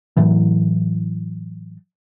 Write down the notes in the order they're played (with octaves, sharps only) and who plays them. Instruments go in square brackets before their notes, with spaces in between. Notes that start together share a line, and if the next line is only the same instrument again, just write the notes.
[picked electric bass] A2 E3 F#3